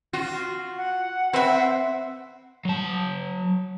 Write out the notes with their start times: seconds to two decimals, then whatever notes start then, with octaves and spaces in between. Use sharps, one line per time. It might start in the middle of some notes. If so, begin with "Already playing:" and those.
0.13 F4 F#4
0.77 F#5
1.33 C4 B4 E5
2.65 F#3 A5